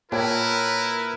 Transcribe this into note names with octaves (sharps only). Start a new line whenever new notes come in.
A#2 E4 A#4 B4 C#5 G5 A5